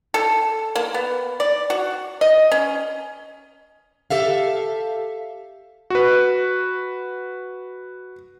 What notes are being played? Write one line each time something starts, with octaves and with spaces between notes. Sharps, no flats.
A4
A#3
B3
D5
F#4
D#5
C#4
G4 A4 E5 F5
F#4 B4